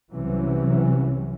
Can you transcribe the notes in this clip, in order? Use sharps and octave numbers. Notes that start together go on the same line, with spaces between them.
C2 C3 E3 F#3 C#4